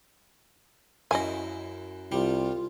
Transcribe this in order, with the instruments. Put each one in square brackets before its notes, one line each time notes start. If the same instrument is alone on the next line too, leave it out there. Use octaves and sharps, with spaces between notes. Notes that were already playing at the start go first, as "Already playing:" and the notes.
[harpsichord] F#2 E4 [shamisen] D#5 G#5
[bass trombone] C2 [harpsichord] G3 [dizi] F4